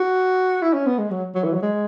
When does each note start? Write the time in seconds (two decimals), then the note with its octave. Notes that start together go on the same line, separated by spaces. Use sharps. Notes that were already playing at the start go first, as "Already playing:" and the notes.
Already playing: F#4
0.62 E4
0.73 C#4
0.86 B3
0.99 G#3
1.11 F#3
1.35 F#3
1.44 E3
1.54 F#3
1.62 G#3